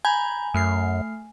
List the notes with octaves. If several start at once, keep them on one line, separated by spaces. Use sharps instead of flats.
G#5 A#5 B5 G6
F#2 A3 F6 C7